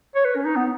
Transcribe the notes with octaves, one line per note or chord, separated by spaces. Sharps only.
C#5
B4
C#4
D#4
B3